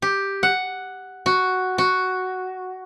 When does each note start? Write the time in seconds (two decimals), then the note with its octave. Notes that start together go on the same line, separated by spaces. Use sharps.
0.02 G4
0.43 F#5
1.26 F#4
1.78 F#4